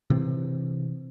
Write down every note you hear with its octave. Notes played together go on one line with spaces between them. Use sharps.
C3 E3 C4